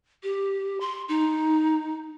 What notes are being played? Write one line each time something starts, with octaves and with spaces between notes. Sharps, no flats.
G4
C6
D#4